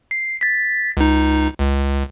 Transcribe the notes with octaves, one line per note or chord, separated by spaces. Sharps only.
C7
A6 B6
C#2 D#4
C#2